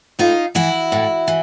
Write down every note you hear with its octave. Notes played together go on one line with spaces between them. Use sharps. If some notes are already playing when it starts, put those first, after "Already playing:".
A2 D#4 F4
E3 E4 F#4
A2
E3